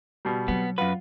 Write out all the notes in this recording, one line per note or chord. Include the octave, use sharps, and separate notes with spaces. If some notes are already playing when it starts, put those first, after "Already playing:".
B2 G3
F#3 B3 C4
F#2 F4 B4 F#5